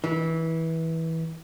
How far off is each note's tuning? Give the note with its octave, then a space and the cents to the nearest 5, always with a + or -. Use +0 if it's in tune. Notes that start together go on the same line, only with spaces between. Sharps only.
E3 -20